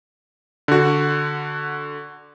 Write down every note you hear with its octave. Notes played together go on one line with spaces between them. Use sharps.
D3 F#4